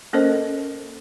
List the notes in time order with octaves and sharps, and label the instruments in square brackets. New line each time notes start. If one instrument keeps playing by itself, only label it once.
[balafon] A#3 C#4 A4 A#4 C5 D#5